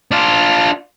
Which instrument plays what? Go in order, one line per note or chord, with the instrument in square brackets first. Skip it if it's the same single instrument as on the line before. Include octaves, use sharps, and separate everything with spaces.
[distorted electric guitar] D4 F4